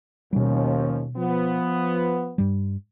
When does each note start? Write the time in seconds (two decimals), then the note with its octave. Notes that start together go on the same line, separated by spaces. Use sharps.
0.33 D#2 B2 F3 G3 C#4
1.17 F3 B3
2.38 G2 G3